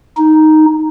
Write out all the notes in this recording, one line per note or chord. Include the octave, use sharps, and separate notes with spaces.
D#4